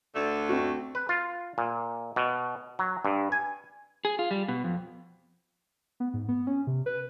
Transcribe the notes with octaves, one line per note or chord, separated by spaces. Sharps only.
D2 D3 A3
C4 F#4
B4
F4
A#2
B2
F#3
G2
G#5
G#4
F4
G3
B2
F2
B3
G#2
B3
C#4
C3
B4